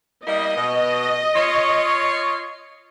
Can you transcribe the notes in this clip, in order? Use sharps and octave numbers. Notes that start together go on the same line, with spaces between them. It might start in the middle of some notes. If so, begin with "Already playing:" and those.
G3 A#3 E4 D#5
B2
F4 C#5